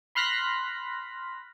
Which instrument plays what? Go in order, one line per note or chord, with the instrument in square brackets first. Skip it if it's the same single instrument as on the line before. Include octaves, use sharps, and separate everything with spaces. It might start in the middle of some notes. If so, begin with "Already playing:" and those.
[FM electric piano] B5 C6 F6 F#6 A#6 B6